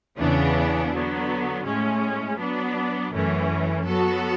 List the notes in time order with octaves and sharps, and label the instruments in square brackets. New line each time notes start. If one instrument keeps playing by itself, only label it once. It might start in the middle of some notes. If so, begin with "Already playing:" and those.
[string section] E2 C#3 E3 B3 D4
D3 F#3 B3
A2 G#3 C#4
F#3 B3 D4
F#2 E3 A3 C#4
F#3 B3 F#4 A4